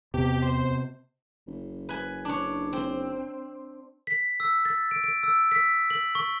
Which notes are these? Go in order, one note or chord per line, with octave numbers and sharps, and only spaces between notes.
E2 C3 B3 G4
C5
F#1
B4 G#5
D4 C#5
C4
B6
E6
A6
D7
D7
E6
B6
F#7
C#6